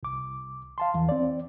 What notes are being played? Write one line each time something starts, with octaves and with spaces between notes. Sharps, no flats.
C2 D6
F5 A5 C6
E2 E3
C4 D5